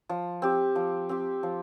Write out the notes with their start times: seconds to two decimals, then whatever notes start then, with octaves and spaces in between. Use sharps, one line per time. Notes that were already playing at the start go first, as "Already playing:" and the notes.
0.09 F3
0.42 C4 G4
0.75 F3
1.09 C4 G4
1.43 F3